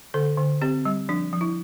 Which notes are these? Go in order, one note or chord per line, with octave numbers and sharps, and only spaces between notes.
D3 A4
D3
C4 G4
G3
F3 D4
F3
E4